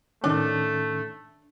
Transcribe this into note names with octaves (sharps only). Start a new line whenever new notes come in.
A2 D#3 A3 C#4 D4